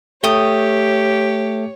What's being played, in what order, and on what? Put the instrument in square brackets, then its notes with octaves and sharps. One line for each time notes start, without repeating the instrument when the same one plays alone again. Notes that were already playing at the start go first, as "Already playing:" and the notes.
[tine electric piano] A3 [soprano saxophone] G4 [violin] C#5 [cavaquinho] G5 D#6